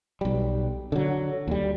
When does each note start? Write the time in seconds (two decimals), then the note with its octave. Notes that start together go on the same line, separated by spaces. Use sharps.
0.21 B1 G3
0.92 D3 F#3
1.48 D#2 G3